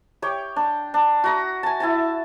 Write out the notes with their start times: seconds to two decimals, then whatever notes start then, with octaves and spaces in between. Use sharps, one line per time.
0.22 G4 C#5 G5 D6
0.56 D4
0.94 D4
1.24 F#4 A#5 D#6
1.63 G#5 A5
1.80 E4 G#5 A5